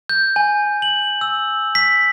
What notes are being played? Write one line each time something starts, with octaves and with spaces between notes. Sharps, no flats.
G6
G#5
F#7
E6
B6